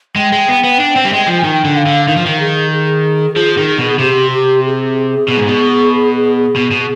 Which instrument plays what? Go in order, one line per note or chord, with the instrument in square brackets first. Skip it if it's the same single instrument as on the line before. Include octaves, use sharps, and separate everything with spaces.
[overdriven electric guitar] G#3 [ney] G5
[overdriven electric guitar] G#3
B3
B3
D4
C4
G3
G#3
F3
[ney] G#5
[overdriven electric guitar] D#3 [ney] G5
[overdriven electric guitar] D3
[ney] F5
[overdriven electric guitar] D3
[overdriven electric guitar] D#3 [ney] F5
[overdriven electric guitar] F3
D#3
[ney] G#4
G#4
[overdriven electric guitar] F3
D#3
B2
[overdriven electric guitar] C3 [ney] G4
[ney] G4
G#4
[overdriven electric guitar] B2
G#2
B2
B2
B2